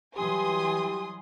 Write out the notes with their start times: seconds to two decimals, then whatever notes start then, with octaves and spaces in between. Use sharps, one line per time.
0.18 E3 F#3 G3 G4 G#5 C6 D#6